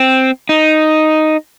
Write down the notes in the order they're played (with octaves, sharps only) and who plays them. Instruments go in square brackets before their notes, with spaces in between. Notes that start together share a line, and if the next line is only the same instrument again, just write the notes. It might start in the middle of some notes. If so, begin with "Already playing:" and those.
Already playing: [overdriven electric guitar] C4
D#4